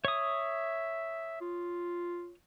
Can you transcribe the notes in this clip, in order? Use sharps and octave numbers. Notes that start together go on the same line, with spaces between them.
C#5 E5 D#6
F4